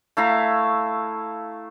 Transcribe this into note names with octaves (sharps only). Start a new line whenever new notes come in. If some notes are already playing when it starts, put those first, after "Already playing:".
A3 E4 F5 A#5